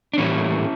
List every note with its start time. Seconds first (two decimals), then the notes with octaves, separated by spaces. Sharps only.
0.13 D4
0.18 A2 E3 G3 A#3 C#4 E4